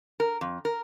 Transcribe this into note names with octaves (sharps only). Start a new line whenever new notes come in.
A#4
F2
A#4